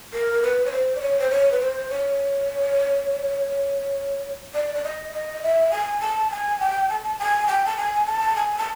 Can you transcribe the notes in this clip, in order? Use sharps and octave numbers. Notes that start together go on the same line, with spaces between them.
A#4
B4
C#5
C5
D5
C#5
C5
C#5
B4
C5
C#5
D5
D5
D#5
D#5
E5
G#5
A5
G#5
G5
A5
A5
G#5
G5
A5
G#5
A5
G#5
A5